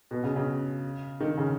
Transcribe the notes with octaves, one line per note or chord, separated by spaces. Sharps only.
B2
C#3
C#3
D#3
C#3